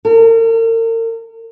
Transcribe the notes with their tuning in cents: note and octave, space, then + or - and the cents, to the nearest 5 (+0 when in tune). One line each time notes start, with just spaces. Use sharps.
A#4 -40